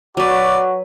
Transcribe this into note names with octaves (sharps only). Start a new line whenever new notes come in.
F#3 F#4 B4 D5